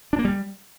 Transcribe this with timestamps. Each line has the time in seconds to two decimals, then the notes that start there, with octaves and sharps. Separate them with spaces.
0.13 D4
0.19 A#3
0.25 G3